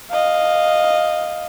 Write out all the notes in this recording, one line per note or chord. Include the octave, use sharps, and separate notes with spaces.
D#5 F5